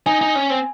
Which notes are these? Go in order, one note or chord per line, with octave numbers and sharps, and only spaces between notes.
D#4 G#5
D#4
C#4
C4